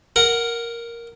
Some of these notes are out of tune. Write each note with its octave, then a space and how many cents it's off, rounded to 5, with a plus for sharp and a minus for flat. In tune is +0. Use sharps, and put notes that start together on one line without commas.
A#4 +0 F#5 +0